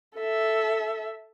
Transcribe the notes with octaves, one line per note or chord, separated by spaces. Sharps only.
A4 E5